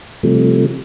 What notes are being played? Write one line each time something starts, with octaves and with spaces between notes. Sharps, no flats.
C3 F3 G3 A3